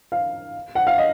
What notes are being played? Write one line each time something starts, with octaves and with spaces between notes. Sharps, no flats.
F5
F#5
F5
D#5